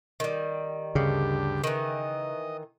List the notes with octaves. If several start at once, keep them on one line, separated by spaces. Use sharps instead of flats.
D#3 G3
D2 G2 C#3 G4
D#3 E3 D#5